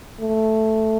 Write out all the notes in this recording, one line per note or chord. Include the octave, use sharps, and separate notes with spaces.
A3